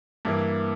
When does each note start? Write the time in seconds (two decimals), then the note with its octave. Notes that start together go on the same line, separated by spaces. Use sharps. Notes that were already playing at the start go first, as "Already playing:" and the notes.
0.25 G2 E3 A#3